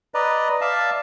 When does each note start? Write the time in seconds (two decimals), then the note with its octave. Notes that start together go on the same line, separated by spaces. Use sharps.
0.14 B4 D5 D#5 A#5
0.61 D5 E5 F5 A5